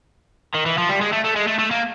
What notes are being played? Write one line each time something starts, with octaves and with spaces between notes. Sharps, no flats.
D#3
E3
F3
G3
G#3
A3
A3
G#3
A3
A3
A#3